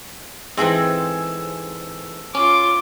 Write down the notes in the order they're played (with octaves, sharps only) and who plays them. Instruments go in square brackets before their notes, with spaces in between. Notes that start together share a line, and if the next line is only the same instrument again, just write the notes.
[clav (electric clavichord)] G#2 E3 [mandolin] C4 G#4 A4
[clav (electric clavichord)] C#4 [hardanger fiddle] F4 D6